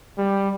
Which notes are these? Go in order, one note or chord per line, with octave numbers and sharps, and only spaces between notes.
G3